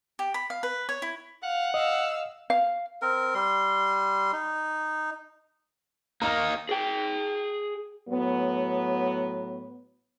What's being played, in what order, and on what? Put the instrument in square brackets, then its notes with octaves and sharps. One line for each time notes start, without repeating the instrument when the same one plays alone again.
[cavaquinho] G4
B5
F5
B4
C#5
E4
[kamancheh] F5 [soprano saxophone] F#5
[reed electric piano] D#5 [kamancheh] F5 E6
[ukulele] F5
[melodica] C4 A#4
G3 C6
D#4
[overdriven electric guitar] A#3 D#4 [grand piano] A#5 F6
[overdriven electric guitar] G#4 G5
[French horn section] A2 F#3 B3